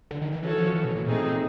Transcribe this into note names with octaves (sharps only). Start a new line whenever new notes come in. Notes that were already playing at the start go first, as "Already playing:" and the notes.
D3
D#3
E3
E3 C#4 F#4 A4 C#5
F3
E3
B2
A#2
A#2 A3 C4 D#4 G#4